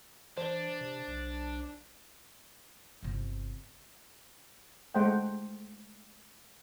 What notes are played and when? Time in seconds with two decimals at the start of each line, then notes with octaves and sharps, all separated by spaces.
0.37 E3 D4 C5
0.81 C3
1.07 B1
3.03 G1 C3
4.95 G#3 A3 C5 F#5 G5